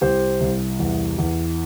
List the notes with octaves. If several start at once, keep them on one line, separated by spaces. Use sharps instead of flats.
C2 G4 C5
C2
E2
E2